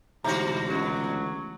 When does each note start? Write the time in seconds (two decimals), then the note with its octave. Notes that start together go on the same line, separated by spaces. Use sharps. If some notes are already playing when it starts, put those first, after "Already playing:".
0.24 D2 G#2 B2 E3 F#4 A#5
0.69 C#2 F#3